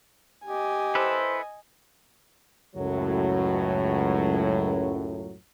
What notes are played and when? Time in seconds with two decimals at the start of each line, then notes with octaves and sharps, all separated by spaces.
0.46 G4 D#5 G#5
0.95 E4 A4 B4 C5
2.75 C#2 F#2 A2 F#3